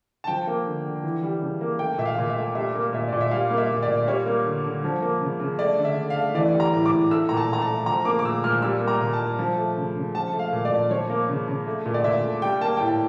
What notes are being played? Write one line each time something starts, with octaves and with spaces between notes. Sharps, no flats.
A5
F3 G5
A#3
D3
D3
E3
G3
C#3
A#3
A3 G5
A#2 E5
F5
A#2
E5
A3
G3 E5
A#3
A#2 E5
A#2 D5
E5
G3 F5
A#3
E5
A#2
D5
A#2
G3 C#5
A#3
D3
D3
F3
A#3
C#3
C#3
A3 D5
D3
E5
D3
F5
A3
E3 D5
G3
A#5
A2
D6
A2
A3 E6
A#2 A#5
A5
A#2 A#5
A5
A3
F3 A#5
A#3 D6
D6
A#2 E6
A#2 F6
G3 E6
A#3
A#5
A#2
A5
A#2
F3
A3
C#3
C#3
F3 A5
A3
F5
A#2
D5
A#2
F3 C#5
A#3
C#3
C#3
A3
A#2
D5
A#2 E5
A3
G3 G5
A#3 A5
A2 G5
A5